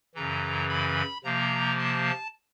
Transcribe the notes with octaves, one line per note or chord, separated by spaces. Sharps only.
F#2 C#3 E3 A#5
B5
C3 F3 A#3 A#5
A5